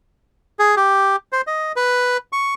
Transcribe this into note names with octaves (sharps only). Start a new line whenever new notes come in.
G#4
G4
C5
D#5
B4
C#6